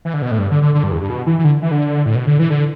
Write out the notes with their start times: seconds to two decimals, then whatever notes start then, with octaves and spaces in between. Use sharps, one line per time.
0.05 E3
0.14 D3
0.22 B2
0.31 A2
0.39 G2
0.51 D3
0.62 D3
0.75 D3
0.83 G2
0.92 E2
1.01 G2
1.10 B2
1.27 E3
1.39 E3
1.44 D3
1.62 E3
1.71 D3
2.06 A2
2.15 B2
2.27 D3
2.39 E3
2.50 D3